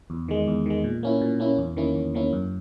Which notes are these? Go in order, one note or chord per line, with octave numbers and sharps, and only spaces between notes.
E2
D#3 G#3
E2
D#3 G#3
A#2
A#3 C#4 E4
A#2
A#3 C#4 E4
E2
D#3 A#3 C#4 E4
E2
D#3 A#3 C#4 E4
F#2